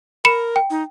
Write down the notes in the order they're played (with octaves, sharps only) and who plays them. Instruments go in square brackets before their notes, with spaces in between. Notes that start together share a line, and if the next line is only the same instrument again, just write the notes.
[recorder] A#4 [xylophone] B5 C#7 E7
[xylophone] G5
[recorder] D#4